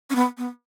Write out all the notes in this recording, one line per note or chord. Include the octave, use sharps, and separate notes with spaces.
C#4
B3
B3